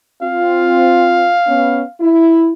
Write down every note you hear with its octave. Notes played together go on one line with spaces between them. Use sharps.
C4 F4 F5
B3 C#4
E4